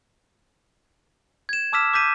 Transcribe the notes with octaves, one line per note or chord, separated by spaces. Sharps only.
G#6 E7
A5 D6 E6 F6 B6 E7
D6 G6 B6 D#7